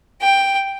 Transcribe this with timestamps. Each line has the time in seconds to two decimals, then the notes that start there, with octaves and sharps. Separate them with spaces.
0.21 G5